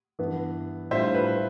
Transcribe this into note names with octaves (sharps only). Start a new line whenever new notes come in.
G2 E3 B3
A2 G3 D4 F4 C5 E5
B4